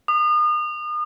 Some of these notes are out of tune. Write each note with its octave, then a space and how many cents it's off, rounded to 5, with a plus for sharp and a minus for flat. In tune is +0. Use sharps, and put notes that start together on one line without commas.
D#6 -35